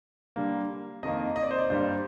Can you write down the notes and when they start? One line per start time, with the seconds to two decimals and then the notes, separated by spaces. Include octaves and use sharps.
0.36 D3 G3 A#3
1.03 F2 D#3 A#3 D#5
1.36 D#5
1.43 D5
1.51 C5
1.59 D5
1.70 G2 D3 G3 A#3 C5